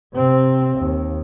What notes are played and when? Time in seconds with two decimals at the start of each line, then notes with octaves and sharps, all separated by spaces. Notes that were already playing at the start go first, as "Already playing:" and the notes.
0.14 C3 C4
0.78 D#2